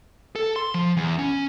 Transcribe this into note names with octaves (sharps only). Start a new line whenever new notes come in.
A4
C6
F3
E2
C#4